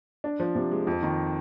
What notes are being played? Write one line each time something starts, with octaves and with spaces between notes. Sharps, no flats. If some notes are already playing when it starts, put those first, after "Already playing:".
D4
F3
C3
G#3
F2
D#3